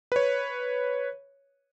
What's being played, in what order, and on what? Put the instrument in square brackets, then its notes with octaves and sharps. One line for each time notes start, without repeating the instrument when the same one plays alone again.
[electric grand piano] B4 C#5